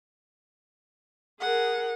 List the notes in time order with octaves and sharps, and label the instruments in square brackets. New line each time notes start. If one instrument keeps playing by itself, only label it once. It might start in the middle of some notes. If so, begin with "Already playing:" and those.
[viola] G#4 A#4 [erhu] F#5